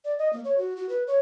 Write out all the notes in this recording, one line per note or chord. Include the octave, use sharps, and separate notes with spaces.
D5
D#5
A#3
C#5
F#4
F#4
B4
C#5